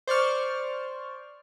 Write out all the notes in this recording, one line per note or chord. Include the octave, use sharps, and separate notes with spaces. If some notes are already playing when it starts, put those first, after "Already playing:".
C5 D5 C#6 F6